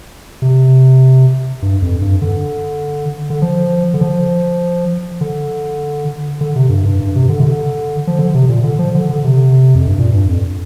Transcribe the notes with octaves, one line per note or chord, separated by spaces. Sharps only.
C3
G2
F2
G2
D3
D3
F3
D3
F3
D3
D3
C3
G2
G2
G2
C3
D3
C3
D3
F3
D3
C3
A#2
D3
F3
D3
D3
C3
F2
G2
A#2
G2
F2